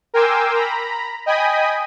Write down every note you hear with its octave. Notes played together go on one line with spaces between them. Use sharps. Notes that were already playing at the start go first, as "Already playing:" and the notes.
A#4 G5 G#5 C6 D6 E6
A#5 B5
D#5 G5 G#5 B5 D#6